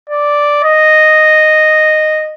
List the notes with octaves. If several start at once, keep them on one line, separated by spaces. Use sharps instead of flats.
D5
D#5